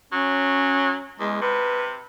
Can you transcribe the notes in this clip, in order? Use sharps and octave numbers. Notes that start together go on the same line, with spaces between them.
F#3 C#4
E2 G#3
C3 B4